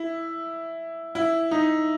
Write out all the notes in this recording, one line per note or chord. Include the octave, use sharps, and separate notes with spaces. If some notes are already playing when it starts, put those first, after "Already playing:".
Already playing: E4
E4
D#4